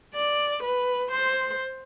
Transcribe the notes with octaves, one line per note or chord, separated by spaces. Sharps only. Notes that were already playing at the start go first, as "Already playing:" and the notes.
D5
B4
C5